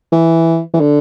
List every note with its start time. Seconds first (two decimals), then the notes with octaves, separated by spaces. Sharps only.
0.12 E3
0.74 E3
0.81 D3